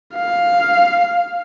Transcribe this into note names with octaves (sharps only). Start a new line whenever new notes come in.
F5